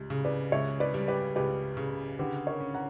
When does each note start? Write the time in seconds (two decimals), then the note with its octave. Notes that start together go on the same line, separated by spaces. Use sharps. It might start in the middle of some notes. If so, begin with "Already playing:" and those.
Already playing: C#2 G3
0.10 C#3
0.25 B4 D5
0.52 C#2 C#5 E5
0.80 B4 D5
0.94 G3
1.08 G4 B4
1.36 C#2 G4 B4
1.77 C#3
2.19 D3 G4 B4
2.47 A#4 C#5
2.60 C#4
2.74 F#5 A#5